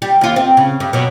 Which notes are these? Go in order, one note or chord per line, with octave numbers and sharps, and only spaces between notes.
G3
D#2 F4
C4
C#3
G2
B2 F#3